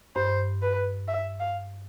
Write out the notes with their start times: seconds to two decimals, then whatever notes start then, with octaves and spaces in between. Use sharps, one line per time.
0.16 G2 C5
0.62 B4
1.08 E5
1.40 F5